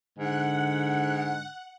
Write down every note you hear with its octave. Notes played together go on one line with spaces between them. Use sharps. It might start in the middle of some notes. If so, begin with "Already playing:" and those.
G#2 D3 F#5